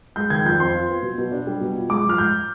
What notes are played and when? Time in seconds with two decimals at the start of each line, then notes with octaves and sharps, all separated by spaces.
0.16 G#3 G6
0.30 D#3 G#6
0.45 F2 G6
0.60 C4 C6
0.75 F4
0.89 B3
1.03 B2
1.18 B2
1.32 D4
1.47 G3
1.61 B2
1.76 F4
1.89 G#3 D6
2.05 F3 F6
2.18 G#2 G6